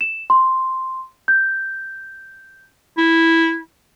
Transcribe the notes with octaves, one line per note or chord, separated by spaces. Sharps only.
E7
C6
G6
E4